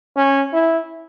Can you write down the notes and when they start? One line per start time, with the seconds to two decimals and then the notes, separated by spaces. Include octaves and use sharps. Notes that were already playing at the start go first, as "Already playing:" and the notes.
0.17 C#4
0.53 E4